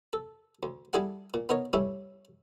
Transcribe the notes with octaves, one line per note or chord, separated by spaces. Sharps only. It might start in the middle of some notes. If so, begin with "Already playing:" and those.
A4
D2
G3 D4 E4 G#4 A4 F#5
A#2
B3 D#4 A#4 C#5
G2 G3 A3 C#4 E4